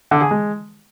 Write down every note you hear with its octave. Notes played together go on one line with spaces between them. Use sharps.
D3
G#4
G#3